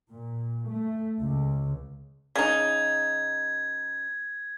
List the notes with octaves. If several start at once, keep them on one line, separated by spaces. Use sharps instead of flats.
A#2
A3
C#2
C#3 D#4 G#6